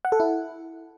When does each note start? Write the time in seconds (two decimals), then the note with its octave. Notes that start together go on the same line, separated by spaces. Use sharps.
0.05 F#5
0.12 A4
0.20 E4